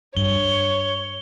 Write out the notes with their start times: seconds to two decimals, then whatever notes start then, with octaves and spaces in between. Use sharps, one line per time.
0.17 G2 C#5 G7